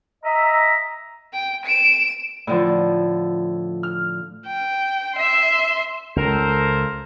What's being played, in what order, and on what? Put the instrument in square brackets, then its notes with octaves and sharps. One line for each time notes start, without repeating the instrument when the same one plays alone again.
[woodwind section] D#5 E5 A#5
[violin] G5
D7 E7
[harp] A2 D3 F3
F6
[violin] G5
E5 C6
[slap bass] C#2 [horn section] A4 A#4 C5